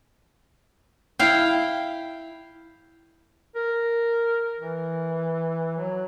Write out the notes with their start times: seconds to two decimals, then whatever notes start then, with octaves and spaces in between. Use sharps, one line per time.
1.19 E4 F5 G5
3.55 A#4
4.59 E3
5.77 F#3